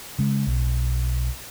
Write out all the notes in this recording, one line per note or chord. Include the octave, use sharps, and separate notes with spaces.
C#3 G#3
B1